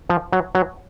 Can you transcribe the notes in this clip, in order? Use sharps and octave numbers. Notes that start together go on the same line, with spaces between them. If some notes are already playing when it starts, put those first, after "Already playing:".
F3
F#3
F#3